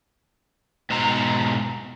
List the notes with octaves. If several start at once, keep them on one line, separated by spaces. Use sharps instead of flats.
G#2 B2 C5 A#5